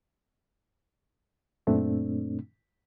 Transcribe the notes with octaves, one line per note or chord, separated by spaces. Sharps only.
F#2 A#2 A3 C4 D4